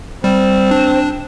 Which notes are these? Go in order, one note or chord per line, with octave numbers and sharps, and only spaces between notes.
G3 C4
D4